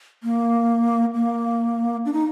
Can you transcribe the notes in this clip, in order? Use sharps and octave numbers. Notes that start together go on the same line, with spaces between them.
A#3
A#3
D4
D#4